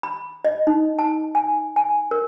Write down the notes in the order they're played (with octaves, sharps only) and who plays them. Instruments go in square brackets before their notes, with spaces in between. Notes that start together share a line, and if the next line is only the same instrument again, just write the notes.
[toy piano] B5
D#5
D#4
A5
G#5
G#5
A#4